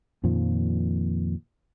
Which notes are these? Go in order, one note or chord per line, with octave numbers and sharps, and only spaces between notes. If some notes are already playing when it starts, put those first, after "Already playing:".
F2 A#2 D#3 F3